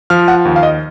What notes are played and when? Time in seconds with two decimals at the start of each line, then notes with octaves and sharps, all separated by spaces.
0.10 F3 F6
0.28 F#5
0.45 D#2
0.56 F5
0.63 D#5